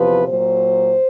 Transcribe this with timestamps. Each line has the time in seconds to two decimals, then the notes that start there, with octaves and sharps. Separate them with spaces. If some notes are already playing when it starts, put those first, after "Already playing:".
Already playing: E2 C3 F3 B4
0.28 A#2 F#3 C5